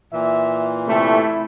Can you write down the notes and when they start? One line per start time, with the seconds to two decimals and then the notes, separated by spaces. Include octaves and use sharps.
0.13 A#2 E3 E5
0.87 C3 A3 E4